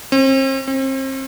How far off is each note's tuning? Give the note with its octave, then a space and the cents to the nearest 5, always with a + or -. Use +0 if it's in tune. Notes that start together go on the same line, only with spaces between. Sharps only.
C4 +40
C4 +35